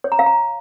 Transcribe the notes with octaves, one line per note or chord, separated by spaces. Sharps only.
C#5
A#5
F5
A#5